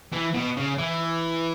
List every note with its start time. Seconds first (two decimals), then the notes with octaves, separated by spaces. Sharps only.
0.13 E3
0.34 B2
0.57 C#3
0.78 E3